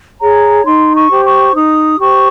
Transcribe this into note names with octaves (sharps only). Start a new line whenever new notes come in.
G#4 C#5 A#5
D#4 C6
C#6
G4 C5
C#6
D#4 D#6
G4 C5 C#6